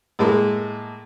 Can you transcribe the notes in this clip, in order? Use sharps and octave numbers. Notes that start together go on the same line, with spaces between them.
A2 G#3 A#3